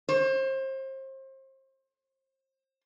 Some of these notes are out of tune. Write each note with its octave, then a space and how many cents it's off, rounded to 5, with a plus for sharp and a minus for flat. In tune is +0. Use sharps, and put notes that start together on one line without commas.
C5 +30